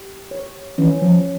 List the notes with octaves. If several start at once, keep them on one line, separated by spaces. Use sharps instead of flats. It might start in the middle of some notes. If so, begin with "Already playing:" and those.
Already playing: G4
C#5
E3 C#4
F3